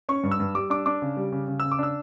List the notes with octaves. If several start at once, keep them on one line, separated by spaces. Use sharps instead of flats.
C#4 C#6
G2
E6
G2
G3 D6
D4 D6
D4 D6
C#3
G3
C#3
C#3
C#3 E6
D6
D4 E6